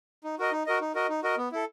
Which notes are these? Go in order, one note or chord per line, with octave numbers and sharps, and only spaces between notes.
D#4
F#4 A#4 D#5
D#4
F#4 A#4 D#5
D#4
F#4 A#4 D#5
D#4
F#4 A#4 D#5
B3
E4 A4